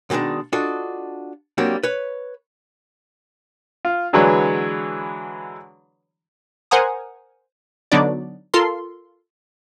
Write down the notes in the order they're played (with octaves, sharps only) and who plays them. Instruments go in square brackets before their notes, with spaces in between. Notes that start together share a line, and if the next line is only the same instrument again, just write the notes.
[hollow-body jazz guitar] B2 D3 D#3 G#3 D4
D4 F4 F#4 A4 D#5
F#3 G3 A#3 C4 D4
B4 C#5
[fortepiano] F4
D3 E3 F#3 G#3 B4 C#5
[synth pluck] A#4 C5 F#5 G#5 A#5 D#6
D3 F#3 B3 D4 D#4 D5
F4 A4 A#4 C6